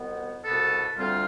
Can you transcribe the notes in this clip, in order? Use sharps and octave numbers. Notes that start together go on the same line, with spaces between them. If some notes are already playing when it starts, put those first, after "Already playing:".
Already playing: C2 B2 B3
C2 B2 B3 A4
D2 D3 G3 C4 F4